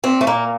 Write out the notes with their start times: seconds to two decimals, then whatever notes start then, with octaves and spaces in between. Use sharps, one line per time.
0.04 A#2 C4
0.21 A3
0.27 A#2 A#3